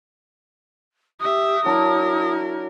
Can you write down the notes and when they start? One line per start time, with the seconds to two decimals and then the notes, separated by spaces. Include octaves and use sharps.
1.20 G4 E5 D#6
1.65 F#3 D4 E4 A#4